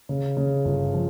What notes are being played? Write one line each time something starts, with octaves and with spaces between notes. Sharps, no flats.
C#3
C#3
G1
F3